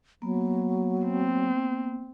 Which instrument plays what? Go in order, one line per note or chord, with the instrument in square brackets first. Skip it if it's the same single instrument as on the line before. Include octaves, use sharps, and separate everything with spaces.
[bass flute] F#3 [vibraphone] A#3 B3
[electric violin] C4